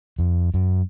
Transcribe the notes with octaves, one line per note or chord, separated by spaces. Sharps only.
F2
F#2